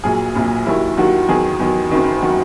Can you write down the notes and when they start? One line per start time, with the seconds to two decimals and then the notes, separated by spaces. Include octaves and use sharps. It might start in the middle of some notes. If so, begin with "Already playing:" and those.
0.04 A#1 A#2 F#3 G#4
0.36 A#1 A#2 F#3
0.66 D#2 D#3 F#3 E4
0.98 D#2 D#3 F#3 F#4
1.28 E2 D#3 F#3 G#4
1.59 E2 D#3 F#3
1.90 F#1 F#2 D#3 F#3
2.22 D#3 F#3 F#4